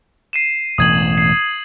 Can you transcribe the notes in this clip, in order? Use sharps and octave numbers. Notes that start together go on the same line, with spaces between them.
C7 D#7 E7
E1 A1 D#6 G#6 F#7
C7